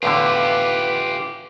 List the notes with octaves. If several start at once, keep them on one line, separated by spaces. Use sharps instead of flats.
E2 A2 D3 F4 G4 B4